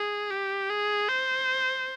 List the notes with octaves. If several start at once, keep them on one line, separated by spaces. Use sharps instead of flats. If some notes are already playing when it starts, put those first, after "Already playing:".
Already playing: G#4
G4
G#4
C5